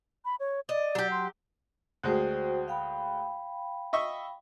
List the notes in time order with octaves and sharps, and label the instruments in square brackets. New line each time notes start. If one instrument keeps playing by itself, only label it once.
[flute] B5
C#5
[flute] D5 [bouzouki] D#5
[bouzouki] F#3 G4
[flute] C6
[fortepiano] D2 G#3 [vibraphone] F#4 C5 G5
[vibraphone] F5 G5 B5
[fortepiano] D#5 E5 C#6